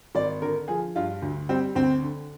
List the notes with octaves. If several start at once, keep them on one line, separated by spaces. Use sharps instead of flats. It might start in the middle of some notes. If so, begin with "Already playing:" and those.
G#1 D5
D3 A#4
F3 G#4
G2 F4
D2
G3 C4
D2 C4
D3